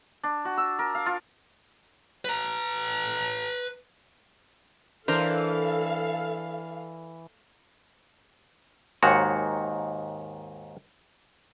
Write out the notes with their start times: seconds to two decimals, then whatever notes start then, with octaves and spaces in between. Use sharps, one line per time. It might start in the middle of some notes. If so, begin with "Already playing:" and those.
0.23 D4
0.45 F#4
0.57 E6
0.79 A#4
0.95 F5
1.06 F4
2.25 B4 A#5
5.08 E3 D4 A4 A#4 C5 F5
9.02 D#2 G#2 D#3 F#4 C#5